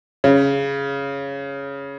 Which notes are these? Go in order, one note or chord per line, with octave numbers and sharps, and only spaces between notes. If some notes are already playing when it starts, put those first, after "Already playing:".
C#3